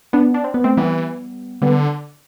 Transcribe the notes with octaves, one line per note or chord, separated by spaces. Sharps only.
B3 D4
D4
C4
B3
A3 C4
E3 G3 B3
D3 G3 B3